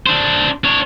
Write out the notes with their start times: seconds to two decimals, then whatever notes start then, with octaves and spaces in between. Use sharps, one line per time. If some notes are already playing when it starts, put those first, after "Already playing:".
0.06 D4 C5
0.64 D4 C#5